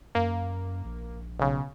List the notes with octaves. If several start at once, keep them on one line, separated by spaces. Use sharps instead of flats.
F#2 A#3
A#1
B1 C#3